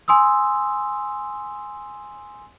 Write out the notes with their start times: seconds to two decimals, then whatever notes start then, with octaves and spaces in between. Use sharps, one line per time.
0.08 G#5 C6 D#6 E6